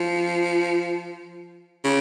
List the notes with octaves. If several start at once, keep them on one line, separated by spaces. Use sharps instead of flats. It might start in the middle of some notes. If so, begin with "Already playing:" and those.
Already playing: F3
C#3